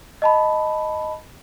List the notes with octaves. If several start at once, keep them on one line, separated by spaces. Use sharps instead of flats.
D#5 A5 B5